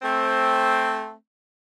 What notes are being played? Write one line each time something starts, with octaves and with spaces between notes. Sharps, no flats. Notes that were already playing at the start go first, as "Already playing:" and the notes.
A3 C4